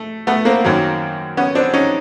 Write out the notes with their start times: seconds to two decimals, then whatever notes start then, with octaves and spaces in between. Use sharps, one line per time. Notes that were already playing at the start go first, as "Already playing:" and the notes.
Already playing: A3
0.27 A3 B3
0.45 A#3 C4
0.64 F#2 D#3 F#3
1.37 B3 C#4
1.55 C4 D4
1.74 C#4 D#4